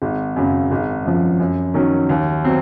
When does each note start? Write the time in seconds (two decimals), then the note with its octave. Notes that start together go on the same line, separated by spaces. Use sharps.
0.02 G#1
0.36 F#2 C#3 F#3
0.71 G#1
1.05 F#2 F3
1.40 F#2
1.74 D#3 F#3 C#4
2.09 D#2
2.45 F#3 C4